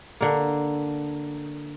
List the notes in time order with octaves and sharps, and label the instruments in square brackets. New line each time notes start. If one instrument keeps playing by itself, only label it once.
[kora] D3 A#3